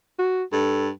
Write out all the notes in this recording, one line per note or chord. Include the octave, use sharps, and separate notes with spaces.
F#4
G2 A4